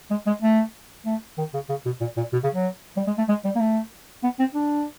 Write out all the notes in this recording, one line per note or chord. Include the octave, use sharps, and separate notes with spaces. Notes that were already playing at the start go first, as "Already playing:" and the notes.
G#3
G#3
A3
A3
D#3
C#3
C#3
B2
A#2
A#2
B2
C#3
F#3
G3
G#3
A3
G#3
G3
A#3
A3
B3
C4
D4